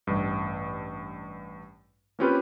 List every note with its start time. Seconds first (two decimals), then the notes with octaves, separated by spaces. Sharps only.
0.07 A1 G2
2.19 A#3 C4 C#4 F4 G4 B4